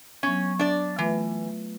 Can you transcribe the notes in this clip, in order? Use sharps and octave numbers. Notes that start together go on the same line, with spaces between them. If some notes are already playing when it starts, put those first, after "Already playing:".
F#3 B3 C#4
D4 D5
E3 A3 F4 B4